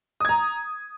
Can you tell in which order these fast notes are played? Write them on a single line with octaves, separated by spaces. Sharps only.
D#6 G#6 A#5